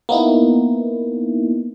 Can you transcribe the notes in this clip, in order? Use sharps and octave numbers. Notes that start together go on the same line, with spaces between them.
A#3 B3 D#4 E4